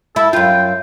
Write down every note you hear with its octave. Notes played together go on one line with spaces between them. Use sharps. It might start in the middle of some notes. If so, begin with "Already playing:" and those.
E4 A4
F#2 F4 G5